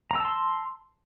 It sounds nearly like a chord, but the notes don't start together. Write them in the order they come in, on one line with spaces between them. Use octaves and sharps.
A#5 E6 A5 C6